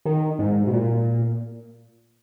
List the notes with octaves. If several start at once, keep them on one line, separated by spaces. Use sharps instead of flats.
D#3
G#2
B2
A#2